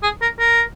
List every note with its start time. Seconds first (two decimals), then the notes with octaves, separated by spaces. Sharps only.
0.03 G#4
0.22 A#4
0.39 A#4